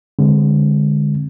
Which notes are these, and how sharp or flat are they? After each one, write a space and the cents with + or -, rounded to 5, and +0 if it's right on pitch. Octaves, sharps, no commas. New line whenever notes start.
D3 +0 G#3 -20 C4 +0